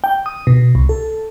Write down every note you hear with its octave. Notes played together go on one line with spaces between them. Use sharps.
G5
D#6
B2
C2
A4